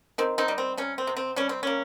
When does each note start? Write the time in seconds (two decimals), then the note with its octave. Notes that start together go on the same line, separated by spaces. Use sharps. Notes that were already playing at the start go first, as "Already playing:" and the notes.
0.18 D#3 C4
0.38 C4 D#4
0.48 G3
0.58 C4
0.77 C3 C#4
0.98 C4
1.07 C3
1.16 C4
1.36 G3 C#4
1.49 C4
1.63 A#3 C#4